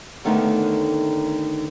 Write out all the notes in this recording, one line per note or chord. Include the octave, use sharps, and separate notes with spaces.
D#2 D3 D#3 A3 B3 D#4